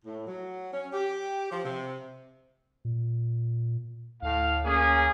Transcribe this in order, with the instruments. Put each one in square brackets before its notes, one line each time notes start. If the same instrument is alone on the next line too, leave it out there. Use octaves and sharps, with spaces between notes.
[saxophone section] A2
F#3
C#4
G4
F3
C3
[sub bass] A#2
[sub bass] D2 [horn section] A2 F5
[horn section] A#3 C#4 G#4